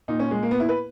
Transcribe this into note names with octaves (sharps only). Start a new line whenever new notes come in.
A#2 D#4
C#4
G#3
A#3
B3
E4
B4